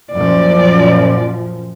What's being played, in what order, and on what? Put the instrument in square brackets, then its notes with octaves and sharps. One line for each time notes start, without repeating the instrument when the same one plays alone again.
[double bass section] F#2 A#2 F3 [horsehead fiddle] D5